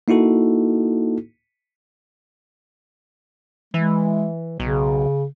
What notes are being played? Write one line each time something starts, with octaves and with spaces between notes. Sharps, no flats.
A#3 D#4 E4 F#4 A4
E3 G#3
B1 C#3